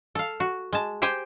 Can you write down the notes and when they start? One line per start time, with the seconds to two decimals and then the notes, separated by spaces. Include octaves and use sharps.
0.15 A4 F5
0.40 F#4
0.72 G#3 A5
1.02 G4 C5 G5 G#5